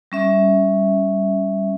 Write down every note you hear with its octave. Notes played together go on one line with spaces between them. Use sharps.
G3 C#4 E5